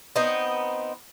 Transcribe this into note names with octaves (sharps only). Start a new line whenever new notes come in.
B3 C4 D#4